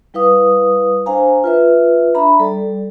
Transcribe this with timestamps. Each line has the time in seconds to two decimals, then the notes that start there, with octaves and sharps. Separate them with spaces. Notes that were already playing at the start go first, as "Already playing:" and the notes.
0.14 G3 E4 B4 F5 D#6
1.06 D4 C5 F5 G#5 A#5
1.44 F4 B4 E5
2.15 D4 E5 A#5 B5
2.39 G3 A4 D5